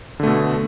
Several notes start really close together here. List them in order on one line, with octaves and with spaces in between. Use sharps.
D3 A3 B2